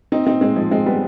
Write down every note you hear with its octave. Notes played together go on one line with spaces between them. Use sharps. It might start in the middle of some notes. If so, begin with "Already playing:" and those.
C4 D#4
C4 D#4
G#3 C4
F3 G#3
G#3 C4
G3 B3